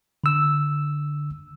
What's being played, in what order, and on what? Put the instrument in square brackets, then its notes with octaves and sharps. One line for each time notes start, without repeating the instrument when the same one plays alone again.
[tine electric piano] D3 E6